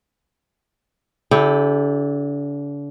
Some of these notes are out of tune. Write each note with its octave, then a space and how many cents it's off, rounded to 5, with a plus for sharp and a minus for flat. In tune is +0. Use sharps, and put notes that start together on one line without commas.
D3 -40 E4 +0 G4 +0